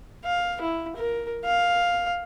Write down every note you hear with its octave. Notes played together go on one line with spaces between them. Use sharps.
F5
E4
A#4
F5